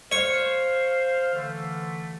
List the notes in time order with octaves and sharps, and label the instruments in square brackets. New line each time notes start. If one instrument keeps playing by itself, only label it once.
[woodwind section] C5 F5 [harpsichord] C#5 C#6
[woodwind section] D3 E3 A3